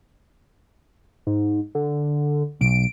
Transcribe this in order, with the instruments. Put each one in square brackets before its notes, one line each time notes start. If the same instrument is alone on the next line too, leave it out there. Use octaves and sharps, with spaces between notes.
[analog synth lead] G#2
D3
[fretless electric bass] B1 [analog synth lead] D7